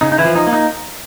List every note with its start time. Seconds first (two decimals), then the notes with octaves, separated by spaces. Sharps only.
0.01 C#3 D#4
0.12 D#4
0.18 E3 E4
0.25 F3
0.36 D#4
0.47 A#3
0.53 D#4